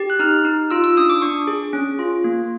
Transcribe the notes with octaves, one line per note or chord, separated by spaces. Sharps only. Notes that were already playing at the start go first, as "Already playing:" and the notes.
Already playing: G4
F#6
D#4 F6
D#4
F4 E6
E6
D4 D#6
D6
D4 C#6
G#4
C#4
F4
A#3